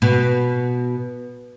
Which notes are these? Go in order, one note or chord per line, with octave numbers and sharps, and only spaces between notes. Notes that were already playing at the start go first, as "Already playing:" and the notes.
B2